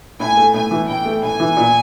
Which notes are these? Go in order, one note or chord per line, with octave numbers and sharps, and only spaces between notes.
A2 G#5
A3
A2 G#5
E3
A2 G5
A3
A2 G#5
E3
A#2